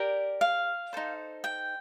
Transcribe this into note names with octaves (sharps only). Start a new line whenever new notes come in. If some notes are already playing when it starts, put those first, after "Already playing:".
Already playing: G4 A#4 D5
F5
D#4 A4 C5
G5